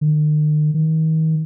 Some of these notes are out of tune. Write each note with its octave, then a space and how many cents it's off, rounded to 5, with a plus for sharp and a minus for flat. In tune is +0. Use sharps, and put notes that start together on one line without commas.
D#3 -45
D#3 +35